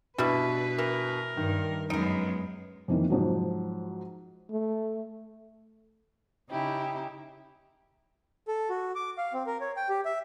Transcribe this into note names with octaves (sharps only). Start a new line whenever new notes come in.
G2 B2 G3 D4 E4 B4
E3 A#4
G2 D#3
F#2 G#3 B3 D#4 A#4 D7
F2 D#3 E3 A#3
G#2 F3 F#3
A3
C#3 C#4 D#4 E4 G4
A4
F#4
D6
F5
C4
A#4
C#5
G5
G4
E5